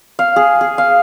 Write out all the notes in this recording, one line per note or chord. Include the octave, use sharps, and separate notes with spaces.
F5
G#4
G#4
F5